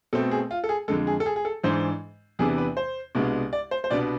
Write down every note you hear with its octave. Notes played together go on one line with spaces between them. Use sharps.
B2 A3 C4 A4
G#4
F4
A4
G#4
F2 D3 G#3 A4
G#4
A4
G#4
G#4
A4
G#2 E3 G#3 D4 C5
E2 C3 E3 B3 D4 G#4
B4
C5
C2 B2 G#3 B3 D4
D5
C5
C5
C2 B2 B3 D4 D5